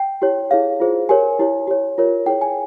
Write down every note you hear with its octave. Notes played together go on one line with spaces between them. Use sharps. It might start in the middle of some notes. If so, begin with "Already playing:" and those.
Already playing: G5
E4 G4 C#5
E4 G#4 C#5 F5
F4 G#4 C5
G4 A#4 C#5 G#5
E4 G4 C#5
G4 C#5
F4 A#4 C#5
E4 G#4 C#5 G5
G#5